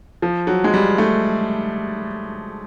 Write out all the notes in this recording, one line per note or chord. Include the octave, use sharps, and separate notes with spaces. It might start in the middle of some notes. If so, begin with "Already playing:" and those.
F3
F#3
G#3
G3
A3